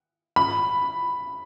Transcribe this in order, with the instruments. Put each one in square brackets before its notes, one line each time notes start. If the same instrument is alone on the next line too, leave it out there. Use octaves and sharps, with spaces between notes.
[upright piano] B5